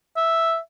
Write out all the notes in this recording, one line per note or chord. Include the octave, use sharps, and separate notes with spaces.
E5